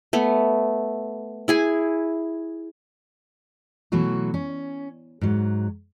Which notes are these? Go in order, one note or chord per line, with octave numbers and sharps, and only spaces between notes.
A3 B3
E4 G#4 G#5
B2 E3 F#3 A3 F#4
C#4
G#2 F#3